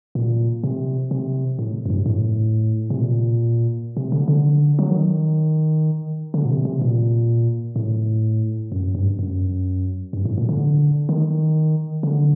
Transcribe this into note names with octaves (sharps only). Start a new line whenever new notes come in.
A#2
C3
C3
A2
F#2
G2
A2
C3
A#2
C3
D3
D3
F#3
D#3
D3
A#2
C3
C3
A#2
A2
F#2
G2
F#2
G2
A2
A#2
D3
D#3
D3